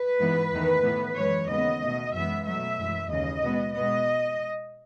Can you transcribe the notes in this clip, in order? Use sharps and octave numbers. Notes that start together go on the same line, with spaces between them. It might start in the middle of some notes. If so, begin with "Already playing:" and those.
Already playing: B4
G#2 E3 B3
E2 D#3 A3
A2 E3 B3
F#2 E3 G#3 C#5
D#2 C#3 G#3 B3 D#5
B2 A3
F#2 E3 G#3 B3 E5
B2 F#3 A3 E5
F#2 E3 G#3
D#2 C#3 E3 D#5
B2 G#3 B3
B2 G#3 B3 D#5